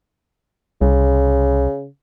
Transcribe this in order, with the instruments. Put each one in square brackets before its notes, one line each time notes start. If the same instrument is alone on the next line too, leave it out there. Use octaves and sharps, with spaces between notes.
[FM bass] C2 [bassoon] C#3